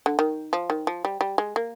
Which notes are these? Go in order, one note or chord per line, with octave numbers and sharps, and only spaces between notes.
D3
D#3
F3
D#3
F3
G3
G3
G#3
A#3